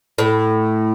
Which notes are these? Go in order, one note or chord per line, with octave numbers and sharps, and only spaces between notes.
A2